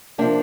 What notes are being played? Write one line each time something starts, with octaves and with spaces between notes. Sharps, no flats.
C3 F3 A#3 D4